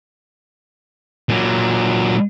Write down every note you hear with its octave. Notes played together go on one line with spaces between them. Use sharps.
A#2 F#3